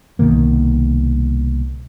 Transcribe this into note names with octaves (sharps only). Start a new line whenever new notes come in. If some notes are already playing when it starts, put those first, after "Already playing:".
C2 B2 D#3 A#3